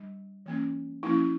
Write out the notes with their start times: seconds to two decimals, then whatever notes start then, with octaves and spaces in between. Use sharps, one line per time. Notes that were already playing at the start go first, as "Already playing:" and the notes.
Already playing: G3 D4
0.46 E3 A#3 C#4
1.03 F3 A#3 C#4 E4